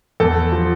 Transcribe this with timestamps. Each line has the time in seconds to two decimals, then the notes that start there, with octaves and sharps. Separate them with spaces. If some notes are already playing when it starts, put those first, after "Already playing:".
0.20 E2 A4
0.52 F3